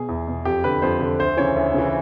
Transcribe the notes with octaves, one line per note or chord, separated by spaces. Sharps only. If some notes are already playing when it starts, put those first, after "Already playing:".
Already playing: B2 G#4
E2
B2
F2 G4
D3 B4
F2 C5
D3
D2 C5
C#3 E3 C#5
D2
C#3 E3